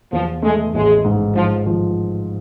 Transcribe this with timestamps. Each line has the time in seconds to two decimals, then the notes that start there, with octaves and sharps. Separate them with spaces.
0.12 E2 F3
0.42 G#3 A3
0.74 A1 G#3
1.04 G#2
1.35 G#2 F3
1.66 F3